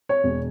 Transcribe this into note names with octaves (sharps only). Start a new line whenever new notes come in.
C#5
E1